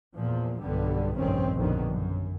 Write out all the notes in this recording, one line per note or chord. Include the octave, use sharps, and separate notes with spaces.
E2 A#2 F3
B1 G2 D3 G3 B3
F1 A#1 G2 D#3 C4 C#4
A#1 F2 B2 D3 D#3
F#2